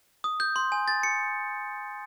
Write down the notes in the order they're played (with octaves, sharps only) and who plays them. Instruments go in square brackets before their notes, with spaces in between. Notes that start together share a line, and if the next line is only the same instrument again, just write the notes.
[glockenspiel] D#6
G6
C6
G#5
A6
C#7